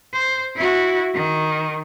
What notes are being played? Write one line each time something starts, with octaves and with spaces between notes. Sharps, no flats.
C5
E4 F#4
D#3